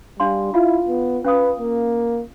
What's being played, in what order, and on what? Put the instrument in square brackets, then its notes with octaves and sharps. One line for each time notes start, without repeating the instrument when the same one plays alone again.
[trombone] G3 [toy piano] D4 F5 C6
[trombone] E4 [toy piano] F4 F5
[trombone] B3
[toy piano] C#4 F5 D#6 [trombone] B4
[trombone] A#3